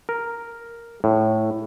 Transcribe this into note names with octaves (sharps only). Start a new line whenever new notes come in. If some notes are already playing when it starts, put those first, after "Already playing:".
A#4
A2